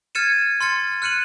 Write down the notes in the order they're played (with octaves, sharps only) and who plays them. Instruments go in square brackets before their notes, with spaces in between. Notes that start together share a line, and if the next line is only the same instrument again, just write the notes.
[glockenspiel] F6 G#6 A6 C#7 D#7 E7
C6 F6 A6 C#7
F6 F#6 C#7 D#7 F#7